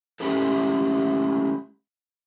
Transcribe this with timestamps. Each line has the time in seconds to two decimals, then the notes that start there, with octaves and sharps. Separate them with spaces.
0.20 G#3 A3 C#4 E4 G4 A4